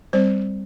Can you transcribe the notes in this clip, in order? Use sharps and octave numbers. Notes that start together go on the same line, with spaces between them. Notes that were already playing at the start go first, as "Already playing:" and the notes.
G3 C4 C5